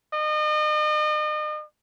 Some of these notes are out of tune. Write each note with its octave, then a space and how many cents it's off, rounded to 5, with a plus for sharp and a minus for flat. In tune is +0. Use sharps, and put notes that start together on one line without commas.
D#5 -40